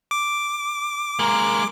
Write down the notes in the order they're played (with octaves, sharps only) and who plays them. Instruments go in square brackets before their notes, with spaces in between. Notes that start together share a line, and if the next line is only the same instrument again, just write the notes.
[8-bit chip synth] D6
[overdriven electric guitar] G#3 A#3 [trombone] A#4